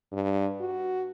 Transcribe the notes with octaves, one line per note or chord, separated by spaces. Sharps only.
G2
F#4